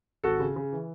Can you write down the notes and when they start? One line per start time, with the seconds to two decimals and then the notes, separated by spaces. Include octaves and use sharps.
0.24 G#1 F#4 A4
0.40 C#3
0.56 C#3
0.72 E3